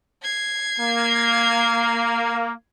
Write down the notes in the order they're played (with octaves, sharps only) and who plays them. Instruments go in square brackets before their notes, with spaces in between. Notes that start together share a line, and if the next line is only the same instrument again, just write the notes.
[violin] G#6 C7
[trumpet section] A#3